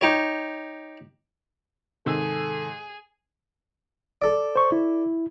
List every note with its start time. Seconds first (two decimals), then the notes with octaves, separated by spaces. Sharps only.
0.01 D#4 G4 C#5
2.06 G#2 C3 D#3 G#4 A4 E6
4.22 A4 D5
4.56 C5 C#6
4.72 E4